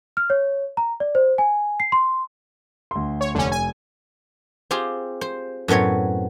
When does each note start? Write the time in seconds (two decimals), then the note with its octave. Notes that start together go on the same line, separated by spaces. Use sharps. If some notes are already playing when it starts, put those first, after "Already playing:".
0.17 F6
0.30 C#5
0.77 A#5
1.00 D5
1.15 C5
1.38 G#5
1.80 C7
1.92 C6
2.91 D2 C6
3.21 C#5
3.35 F1 D3 C#4
3.52 G#5
4.71 C4 F4 G4 G#4 C5
5.21 C5
5.68 F#2 A2 B3 C4 C#5